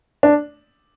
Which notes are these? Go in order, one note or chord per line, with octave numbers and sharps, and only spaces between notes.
D4